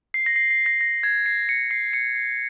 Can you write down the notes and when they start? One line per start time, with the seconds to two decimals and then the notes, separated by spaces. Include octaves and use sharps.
0.14 C7
0.26 A#6
0.36 C7
0.51 C7
0.66 A#6
0.81 A#6
1.03 G#6
1.26 C7
1.49 C#7
1.71 C7
1.93 C#7
2.16 C7